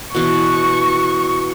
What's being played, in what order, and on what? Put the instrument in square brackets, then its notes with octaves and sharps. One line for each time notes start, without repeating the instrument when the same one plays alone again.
[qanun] B2 E3 [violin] C#6